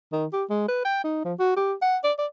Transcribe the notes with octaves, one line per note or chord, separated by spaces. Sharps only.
D#3
G4
G#3
B4
G5
D#4
F3
F#4
G4
F#5
D5
D5